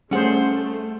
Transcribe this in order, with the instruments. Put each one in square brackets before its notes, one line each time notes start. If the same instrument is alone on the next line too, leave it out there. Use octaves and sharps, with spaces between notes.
[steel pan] G3 G#4 C5 [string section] A3 [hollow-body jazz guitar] C#4 F#5